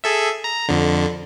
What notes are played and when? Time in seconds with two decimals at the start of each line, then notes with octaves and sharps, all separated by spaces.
0.04 G#4 A4 E5
0.44 A#5
0.69 F2 D3